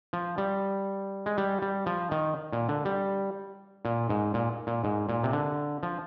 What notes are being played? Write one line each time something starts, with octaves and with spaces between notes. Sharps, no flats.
F3
G3
G#3
G3
G3
F3
D#3
A#2
D3
G3
A#2
G#2
A#2
A#2
G#2
A#2
C3
D3
F3